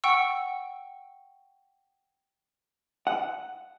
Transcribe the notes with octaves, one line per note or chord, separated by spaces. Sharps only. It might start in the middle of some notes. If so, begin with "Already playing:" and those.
F#5 G5 C#6 E6
F#5